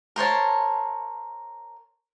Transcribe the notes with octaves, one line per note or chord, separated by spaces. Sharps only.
A#4 C5 C#5 A5